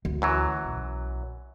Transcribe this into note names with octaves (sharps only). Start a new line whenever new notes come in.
D2
F#2 E3 F#3
B1